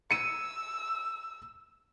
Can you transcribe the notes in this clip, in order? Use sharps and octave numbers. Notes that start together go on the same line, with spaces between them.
E6 C#7 D#7